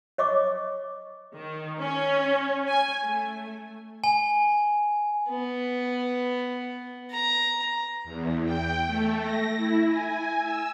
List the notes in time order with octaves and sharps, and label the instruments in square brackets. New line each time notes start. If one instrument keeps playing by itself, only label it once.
[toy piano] C#5 D#5 C#6 D6
[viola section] D#3
C#4
G#5
A3
[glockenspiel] G#5
[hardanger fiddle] B3
A#5
[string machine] E2
G5
A3
A#6
E4
G#5
E6